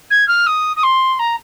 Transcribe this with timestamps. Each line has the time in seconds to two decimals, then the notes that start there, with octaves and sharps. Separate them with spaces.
0.10 G#6
0.28 F6
0.46 D#6
0.76 D#6
0.83 C6
1.19 A#5